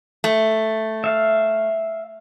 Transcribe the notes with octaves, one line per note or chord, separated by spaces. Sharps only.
A3
E5 F5